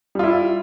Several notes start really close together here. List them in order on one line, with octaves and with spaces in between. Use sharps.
G3 F4 E4